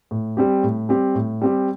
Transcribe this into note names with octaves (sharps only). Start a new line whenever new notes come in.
A2
G3 C4 G4
A2
G3 C4 G4
A2
G3 C4 G4